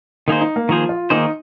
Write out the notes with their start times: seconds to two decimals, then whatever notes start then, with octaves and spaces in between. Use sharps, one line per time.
0.28 D#3 A#3 D#4 G#4 C5
0.41 D#4
0.56 A#3
0.69 D#3 F3 A#3 G#4 C5
0.89 F4
1.10 D#3 A#3 D#4 G#4 C5